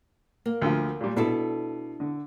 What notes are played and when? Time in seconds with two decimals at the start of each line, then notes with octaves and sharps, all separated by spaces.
0.46 A#3
0.62 D2 D3 F3
1.01 A#2 G3
1.16 B2 D4 E4 A4
2.00 D3